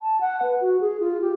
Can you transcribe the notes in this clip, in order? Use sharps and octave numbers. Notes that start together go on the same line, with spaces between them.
A5
F#5
B4
F#4
G#4
F4
G4